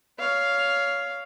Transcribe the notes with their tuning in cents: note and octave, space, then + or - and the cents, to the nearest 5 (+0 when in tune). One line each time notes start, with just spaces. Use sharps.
C#5 +20 F5 +0